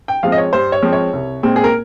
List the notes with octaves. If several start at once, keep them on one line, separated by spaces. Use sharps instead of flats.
G5
F3 G#3 C4 F5
D#5
C#5
G2 C5
C#5
F3 G#3 C4
C#5
C2
A#2 G#3 C4
G#4
A#4